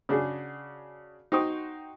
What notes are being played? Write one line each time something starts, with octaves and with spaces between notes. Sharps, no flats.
C#3 D4 F#4 G#4
D#4 F#4 C5 G5 C#6 D#6